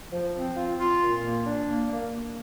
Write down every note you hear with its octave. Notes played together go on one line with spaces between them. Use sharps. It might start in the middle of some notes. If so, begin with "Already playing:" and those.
F3
C4
F4
F4
A#2
A#3
D4
A#3
A#3
A#3